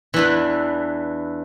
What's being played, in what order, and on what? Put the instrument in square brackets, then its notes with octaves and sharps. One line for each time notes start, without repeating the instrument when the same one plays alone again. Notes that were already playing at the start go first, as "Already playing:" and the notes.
[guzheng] E2 E3 D4 B4